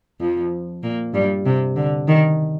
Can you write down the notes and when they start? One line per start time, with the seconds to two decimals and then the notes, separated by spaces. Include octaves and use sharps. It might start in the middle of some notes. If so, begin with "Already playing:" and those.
0.21 F2 F3
0.83 A#2 A#3
1.14 G2 G3
1.46 C3
1.76 D3
2.08 D#3